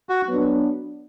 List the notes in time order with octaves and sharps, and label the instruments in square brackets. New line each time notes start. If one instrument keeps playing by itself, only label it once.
[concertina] F#4
[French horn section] F#3 B3 D4